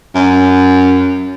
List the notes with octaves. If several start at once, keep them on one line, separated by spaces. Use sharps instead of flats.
F#2